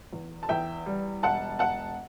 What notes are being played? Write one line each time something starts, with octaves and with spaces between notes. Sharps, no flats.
E2
A5
E2 E5 G5
G3
E1 F#5 A5
E1 F#5 A5